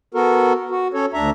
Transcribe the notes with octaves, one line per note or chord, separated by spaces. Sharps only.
B3 F#4 A4 A#4
F#4
C#4 A4 C#5
D2 D4 E5 A#5